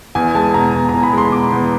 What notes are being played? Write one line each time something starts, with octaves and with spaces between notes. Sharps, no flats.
E2 G#5
G#3 A5
B2 A#5
E2
E2 A#5
B5
G#3 C6
B2 D6
E2